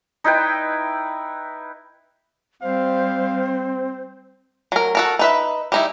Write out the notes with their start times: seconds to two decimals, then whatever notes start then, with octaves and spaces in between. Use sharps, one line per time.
0.24 D#4 E4 B4 G5
2.62 G3 C4 C5 F5
4.72 F#3 A#4
4.95 F#4 A4 A#4
5.19 D#4 B4 E5
5.72 G3 D#4 E4